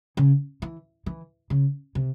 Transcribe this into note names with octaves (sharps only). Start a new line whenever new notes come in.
C#3
E3
E3
C#3
C3